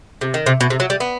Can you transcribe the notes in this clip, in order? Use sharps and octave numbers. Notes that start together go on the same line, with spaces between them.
C3
D#3
C3
B2
C3
F#3
G3
B3